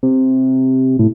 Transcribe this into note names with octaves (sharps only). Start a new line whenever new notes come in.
C3
A2